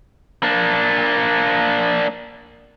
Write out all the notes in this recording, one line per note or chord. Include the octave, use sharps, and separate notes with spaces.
A#3 D4